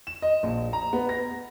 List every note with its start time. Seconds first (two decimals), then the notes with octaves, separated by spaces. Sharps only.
0.07 E7
0.22 D#5
0.43 A#1
0.73 A#5
0.93 B3
1.09 A#6